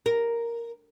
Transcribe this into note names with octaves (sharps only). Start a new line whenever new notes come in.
A#4